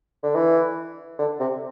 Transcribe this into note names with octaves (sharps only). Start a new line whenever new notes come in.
D3
E3
D3
C3